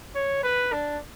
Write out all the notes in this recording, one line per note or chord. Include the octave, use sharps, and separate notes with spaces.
C#5
B4
D4